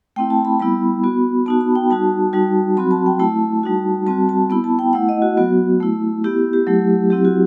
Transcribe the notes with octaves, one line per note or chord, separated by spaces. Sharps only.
A3 C4 E4 G5
A5
B5
G3 B3 E4 B5
B3 F#4
B3 D#4 F#4 A5
B5
G5
G3 D#4 F#4 A5
G3 D#4 F#4
F#3 C4 F#4 B5
A5
G5
A3 E4 A5
G3 D#4 F#4
G3 C4 F#4 A5
A5
B3 E4 B5
A5
G5
A3 E4 F#5
D#5
F#4
F#3 B3 F#4
A3 E4
B3 E4 G4
G4
F#3 A3 E4
F#3 C4 E4 G4
F#4